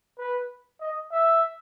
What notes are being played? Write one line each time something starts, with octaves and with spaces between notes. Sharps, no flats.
B4
D#5
E5